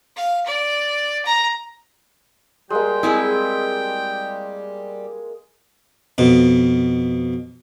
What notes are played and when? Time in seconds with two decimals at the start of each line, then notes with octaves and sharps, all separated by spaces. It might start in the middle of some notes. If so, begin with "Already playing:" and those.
0.16 F5
0.46 D5
1.25 A#5
2.70 G3 G#3 A#3 G4 G5
3.03 G#3 C4 E4 G#4
6.18 F2 B2